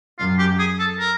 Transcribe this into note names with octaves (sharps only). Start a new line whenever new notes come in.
F#2 F4
G4
G#4
A4
A#4